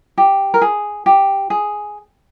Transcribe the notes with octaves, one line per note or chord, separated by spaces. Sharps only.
G4
A#4
G#4
G4
G#4